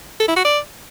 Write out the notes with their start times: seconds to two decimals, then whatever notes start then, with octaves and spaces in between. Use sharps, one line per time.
0.20 A4
0.28 E4
0.36 F#4
0.45 D5